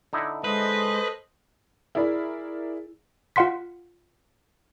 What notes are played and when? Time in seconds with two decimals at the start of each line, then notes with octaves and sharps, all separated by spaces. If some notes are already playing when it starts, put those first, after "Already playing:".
0.13 D3 D#4 E4
0.44 G#3 A4 B4 C5 D#5
1.95 E4 G#4 A#4 D5
3.36 F4 F5 F#5 C6 B6